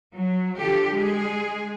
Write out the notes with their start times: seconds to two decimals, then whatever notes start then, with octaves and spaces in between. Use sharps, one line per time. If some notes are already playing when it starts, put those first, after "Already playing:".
0.15 F#3
0.59 D3 F3 G4 A4
0.97 G#3 G#4